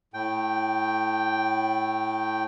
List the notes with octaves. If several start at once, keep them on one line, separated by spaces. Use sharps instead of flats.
A2 G5